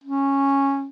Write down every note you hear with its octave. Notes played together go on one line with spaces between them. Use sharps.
C#4